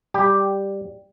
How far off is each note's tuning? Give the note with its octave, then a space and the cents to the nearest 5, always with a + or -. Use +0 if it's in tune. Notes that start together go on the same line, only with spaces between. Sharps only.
G3 +5 G4 +0